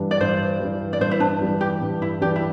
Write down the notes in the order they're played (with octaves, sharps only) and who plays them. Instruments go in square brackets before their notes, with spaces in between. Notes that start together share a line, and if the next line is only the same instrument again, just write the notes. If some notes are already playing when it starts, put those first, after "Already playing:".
Already playing: [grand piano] G2 E3 G3 D4
[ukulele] D5
[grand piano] G2 [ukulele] C5
[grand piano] E3 G3 D4
[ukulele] D5
[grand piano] G2 [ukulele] C5
[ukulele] E4
D4
[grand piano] E3 G3 D4
[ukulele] G4
[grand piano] G2
[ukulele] E4
[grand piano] E3 G3 D4 [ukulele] G4
[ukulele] E4